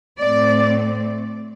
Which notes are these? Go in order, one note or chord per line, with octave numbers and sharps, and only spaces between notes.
A2 A3 C4 D5